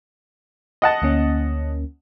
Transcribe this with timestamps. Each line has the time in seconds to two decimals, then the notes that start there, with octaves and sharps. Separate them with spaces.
0.82 D#5 F#5 A5
1.02 D2 A#3 C#4